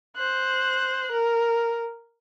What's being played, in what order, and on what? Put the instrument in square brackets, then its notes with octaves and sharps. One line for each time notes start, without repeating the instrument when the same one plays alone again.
[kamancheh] C5 F#6
A#4